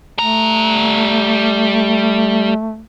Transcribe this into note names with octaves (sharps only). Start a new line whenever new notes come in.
G3 A3 A#5